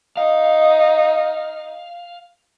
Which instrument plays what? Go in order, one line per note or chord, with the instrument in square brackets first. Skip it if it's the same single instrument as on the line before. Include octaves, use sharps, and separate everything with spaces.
[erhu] D#4 [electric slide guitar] F5